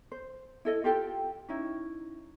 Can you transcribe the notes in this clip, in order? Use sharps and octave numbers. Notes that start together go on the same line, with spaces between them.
C5
E4 A4 D#5
F4 G4 A4 G5
C#4 D#4 E4